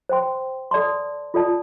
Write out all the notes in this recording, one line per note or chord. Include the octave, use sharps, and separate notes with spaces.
C5 G5 C6
A4 D5 A5 C6
F4 A4 D5 A5